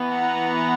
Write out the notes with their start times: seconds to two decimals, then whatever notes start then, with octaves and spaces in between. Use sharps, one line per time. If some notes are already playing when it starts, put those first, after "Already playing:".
Already playing: E3 B3
0.11 F#5 A#5